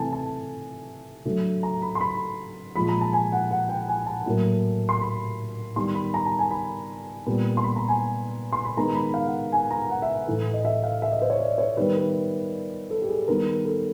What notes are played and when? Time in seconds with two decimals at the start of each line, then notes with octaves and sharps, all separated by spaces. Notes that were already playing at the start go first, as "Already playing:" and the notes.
Already playing: C3 E3 A3 G#5 A5
0.12 A5
1.25 D3 F#3 A3
1.63 A#5
1.82 B5
1.95 C6
2.01 B5
2.76 A#2 F3 G#3 B5
2.89 A#5
3.01 A5
3.13 G#5
3.32 F#5
3.51 F#5
3.69 G5
3.88 G#5
4.06 A5
4.26 A2 F#3 A#3
4.89 C6
5.02 B5
5.76 D#3 G3 B3 C6
5.95 B5
6.14 A#5
6.26 A5
6.39 G#5
6.51 B5
7.27 A#2 G3 B3
7.57 C6
7.64 B5
7.76 A#5
7.89 G#5
8.53 C6
8.65 B5
8.77 D#3 G#3 B3 A#5
8.95 B5
9.14 F5
9.27 F#5
9.52 G#5
9.71 A#5
9.90 F#5
10.02 E5
10.27 A2 E3 A3
10.54 D#5
10.65 E5
10.83 F5
11.02 E5
11.12 D#5
11.22 C5
11.30 C#5
11.40 D5
11.58 C#5
11.77 D#3 G3 B3 B4
11.96 B4
12.90 A4
13.02 G4
13.09 G#4
13.28 D#3 G3 B3 A#4
13.65 A4